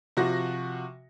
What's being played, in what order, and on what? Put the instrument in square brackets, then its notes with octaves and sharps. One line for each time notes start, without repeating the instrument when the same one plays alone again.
[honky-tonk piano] C3 F3 F#4 A#6